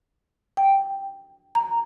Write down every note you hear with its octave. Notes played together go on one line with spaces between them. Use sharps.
G5
A#5